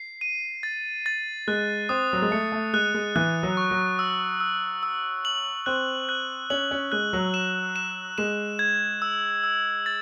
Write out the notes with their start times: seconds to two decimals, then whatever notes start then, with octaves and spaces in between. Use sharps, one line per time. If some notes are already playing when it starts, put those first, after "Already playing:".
Already playing: C7
0.21 D#7
0.63 A6
1.06 A6
1.48 G#3 F#6
1.89 C4 D#6
2.13 F#3
2.22 G#3
2.31 A3 C#7
2.52 A3
2.73 G#3 F#6
2.94 G#3
3.16 E3 F#6
3.43 F#3
3.57 C#6
3.71 F#3
3.99 E6
4.40 E6
4.83 E6
5.25 F#7
5.66 C4 F#6
6.09 F#6
6.50 C#4 F#7
6.71 C#4
6.92 G#3 F#6
7.13 F#3
7.34 E7
7.76 E7
8.18 G#3 E7
8.59 G#6
9.02 E6
9.44 E6
9.86 A6